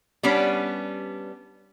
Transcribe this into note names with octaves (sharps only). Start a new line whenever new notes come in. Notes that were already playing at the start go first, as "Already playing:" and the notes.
G3 B3 C#4 D4